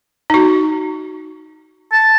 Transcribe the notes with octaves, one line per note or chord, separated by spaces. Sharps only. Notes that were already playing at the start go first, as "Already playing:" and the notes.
D#4 F#4
A5